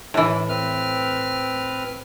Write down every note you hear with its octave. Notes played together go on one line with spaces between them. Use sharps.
A2 E3
C4 B4 F6